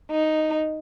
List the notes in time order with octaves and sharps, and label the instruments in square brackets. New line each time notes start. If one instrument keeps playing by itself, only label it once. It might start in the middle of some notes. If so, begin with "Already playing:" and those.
[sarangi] D#4